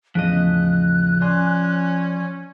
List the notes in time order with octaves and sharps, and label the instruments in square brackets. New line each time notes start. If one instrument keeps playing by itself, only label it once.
[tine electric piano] E2 A2 C#3 [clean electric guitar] F3 D#5 [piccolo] F#6
[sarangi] C#4 [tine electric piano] D5 G#5 C6